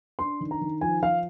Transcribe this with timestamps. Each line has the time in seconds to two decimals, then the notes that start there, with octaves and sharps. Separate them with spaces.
0.19 D4 C6
0.40 D#3
0.51 A#5
0.61 D#3
0.81 F3 G#5
1.02 F3 F5